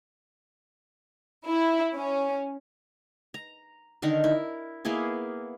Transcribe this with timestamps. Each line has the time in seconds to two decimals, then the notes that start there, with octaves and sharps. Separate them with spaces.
1.47 E4
1.95 C#4
3.34 A#5
4.02 D3 D#3 D#4 A#4
4.24 E4
4.85 A#3 B3 E4 G#4